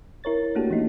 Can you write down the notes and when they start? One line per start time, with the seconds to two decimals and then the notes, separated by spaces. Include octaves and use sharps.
0.24 E4 A#4 C#5 A6
0.55 A3 A#3 D4 F#4 G4 A4
0.70 E3 A#3 D#4 E4